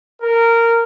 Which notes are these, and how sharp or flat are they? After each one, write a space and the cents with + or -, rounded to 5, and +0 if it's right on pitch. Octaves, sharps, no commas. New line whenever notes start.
A#4 -15